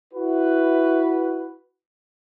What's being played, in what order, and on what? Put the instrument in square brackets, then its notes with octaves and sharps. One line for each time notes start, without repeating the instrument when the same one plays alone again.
[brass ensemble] E4 F#4 B4